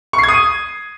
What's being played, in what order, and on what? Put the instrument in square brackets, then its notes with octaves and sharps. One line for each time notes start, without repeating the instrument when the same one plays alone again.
[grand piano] C#6
C7
G#6
D#6
D#7